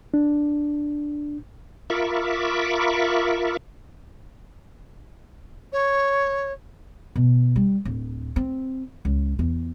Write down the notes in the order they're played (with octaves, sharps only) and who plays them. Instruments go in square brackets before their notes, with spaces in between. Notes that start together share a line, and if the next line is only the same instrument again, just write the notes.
[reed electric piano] D4
[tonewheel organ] F4 A#4 E5 B5 C#6 D6
[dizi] C#5
[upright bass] B2
G3
D1
C4
C#2
E2